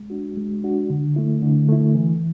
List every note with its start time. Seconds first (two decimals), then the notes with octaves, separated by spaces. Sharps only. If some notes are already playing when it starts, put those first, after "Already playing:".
Already playing: G#3
0.10 D4 F#4
0.37 G#3
0.64 D4 F#4
0.90 D3
1.16 A3 E4
1.42 D3
1.69 A3 E4
1.95 E3